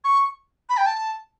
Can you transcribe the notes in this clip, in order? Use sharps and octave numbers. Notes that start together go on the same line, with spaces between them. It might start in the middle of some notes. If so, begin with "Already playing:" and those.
C#6
B5
G5
A5